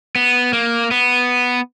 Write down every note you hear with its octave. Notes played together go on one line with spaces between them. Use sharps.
B3
A#3
B3